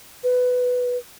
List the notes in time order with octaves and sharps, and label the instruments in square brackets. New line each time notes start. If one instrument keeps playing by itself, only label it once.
[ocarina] B4